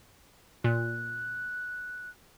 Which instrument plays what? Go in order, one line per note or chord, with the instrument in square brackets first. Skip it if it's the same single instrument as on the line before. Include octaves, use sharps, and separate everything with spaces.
[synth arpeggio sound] A#2 [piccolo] F#6